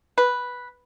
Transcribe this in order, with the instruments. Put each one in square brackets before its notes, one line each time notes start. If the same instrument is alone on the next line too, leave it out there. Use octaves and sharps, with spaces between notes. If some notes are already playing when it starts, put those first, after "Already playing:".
[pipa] B4